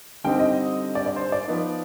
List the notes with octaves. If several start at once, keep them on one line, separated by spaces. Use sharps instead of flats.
D3 G3 C4 D#4 G5
D#5
D5
D5
C5
D5
F3 B3 D#4